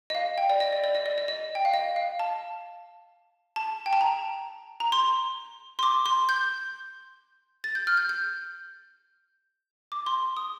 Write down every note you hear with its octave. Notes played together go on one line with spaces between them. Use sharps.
D#5
F5
G5
D5
D#5
D5
D5
D#5
D5
D#5
D#5
G5
F5
D#5
F5
A5
A5
G5
A5
A#5
A#5
C6
C6
D6
C6
G6
A6
G6
F6
G6
G6
D6
C6
D#6